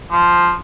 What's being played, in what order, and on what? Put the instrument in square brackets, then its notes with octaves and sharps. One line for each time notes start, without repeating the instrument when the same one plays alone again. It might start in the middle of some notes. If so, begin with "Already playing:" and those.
[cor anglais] F3